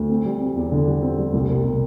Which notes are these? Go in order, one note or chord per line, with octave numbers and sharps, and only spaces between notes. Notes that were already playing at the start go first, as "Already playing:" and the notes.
Already playing: D2
C4
G3
C4
E2
D3
G3
C4
G3
C2
C2
B2